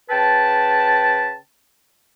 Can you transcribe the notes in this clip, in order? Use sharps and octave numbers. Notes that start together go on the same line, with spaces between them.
C#3 B4 G5 A5